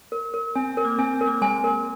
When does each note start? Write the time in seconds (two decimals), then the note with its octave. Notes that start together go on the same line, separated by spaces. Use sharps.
0.12 A#4
0.34 A#4
0.55 C4 G#5
0.70 C4
0.77 A#4
0.84 A#3
0.98 C4 G#5
1.13 C4
1.21 A#4
1.27 A#3
1.42 G#3 G#5
1.64 A#4